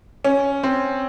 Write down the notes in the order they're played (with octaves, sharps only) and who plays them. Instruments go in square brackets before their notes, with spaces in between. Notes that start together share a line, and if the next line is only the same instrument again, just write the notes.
[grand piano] C#4
C4